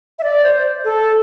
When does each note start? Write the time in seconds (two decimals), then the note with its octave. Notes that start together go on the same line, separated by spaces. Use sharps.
0.19 E5
0.23 D5
0.44 C5
0.85 A4